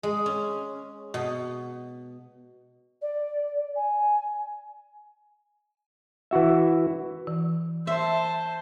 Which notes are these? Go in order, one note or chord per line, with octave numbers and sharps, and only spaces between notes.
G#3
C#4
B2
D5
G#5
E3 E4 F#4 E5
E3
C5 E5 A5